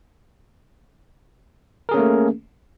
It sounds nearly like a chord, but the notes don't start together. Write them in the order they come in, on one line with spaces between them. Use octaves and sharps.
A#4 G#4 C#4 A#3 A3